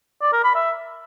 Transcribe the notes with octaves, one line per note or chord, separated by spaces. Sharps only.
D5
A#4
B5
E5